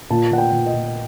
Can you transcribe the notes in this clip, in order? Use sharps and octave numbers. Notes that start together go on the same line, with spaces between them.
A#2 A5
A#2 F#5
G5
A#2
D#5
A#2